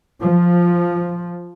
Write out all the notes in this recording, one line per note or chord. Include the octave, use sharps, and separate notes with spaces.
F3